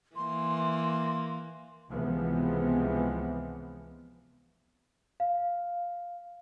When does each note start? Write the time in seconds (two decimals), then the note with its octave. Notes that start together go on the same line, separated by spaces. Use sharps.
0.16 E3 A#3 C6
1.90 C#2 C3 E3 F3 G#3 B3
5.20 F5